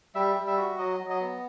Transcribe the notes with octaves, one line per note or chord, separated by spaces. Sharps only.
G3 E5
G3
E5
F#4
F#3 D#5
F#3
D#5
B3